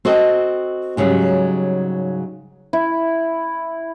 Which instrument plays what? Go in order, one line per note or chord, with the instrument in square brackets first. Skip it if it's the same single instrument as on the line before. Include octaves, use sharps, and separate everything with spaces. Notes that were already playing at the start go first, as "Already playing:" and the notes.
[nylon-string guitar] C4 F#4 A4 D#5 G5
G#2 C#3 F#3 G3
[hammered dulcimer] E4